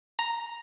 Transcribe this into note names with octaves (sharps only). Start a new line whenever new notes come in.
A#5